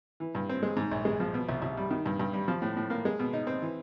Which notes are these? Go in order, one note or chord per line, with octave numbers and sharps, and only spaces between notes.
E3
G2
C4
G#3
G#2
A#1
G#3
F3
B2
C2
C2
G3
D#3
G2
G2
G3
F3
A2
A2
A#3
G#3
B2
D#4
C4
E3